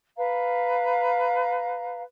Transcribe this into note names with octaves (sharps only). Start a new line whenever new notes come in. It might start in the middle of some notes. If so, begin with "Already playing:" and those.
B4 F5 A#5